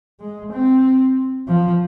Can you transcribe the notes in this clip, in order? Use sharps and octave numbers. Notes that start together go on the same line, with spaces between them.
G#3
C4
F3